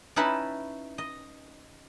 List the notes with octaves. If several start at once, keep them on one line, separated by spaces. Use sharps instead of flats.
C#4 D#4 E4 B4 E5 A5
D#5